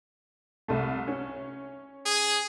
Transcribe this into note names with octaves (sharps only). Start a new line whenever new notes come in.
C2 A3
C#4
G#4